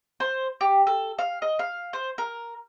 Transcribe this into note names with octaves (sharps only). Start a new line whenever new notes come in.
C5
G4
A4
F5
D#5
F5
C5
A#4